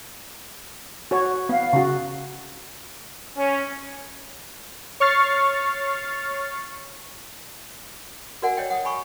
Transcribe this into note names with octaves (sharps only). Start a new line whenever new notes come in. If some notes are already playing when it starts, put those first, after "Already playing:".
F#4 C#5
B3 F5
C#3 F#4
C#4
C#5 C#6 F6 A6 C7
F#4 A#4 D5 F#5 G#5
C#5 D#5 G5
F#5 D#6
G#5 B5 C#6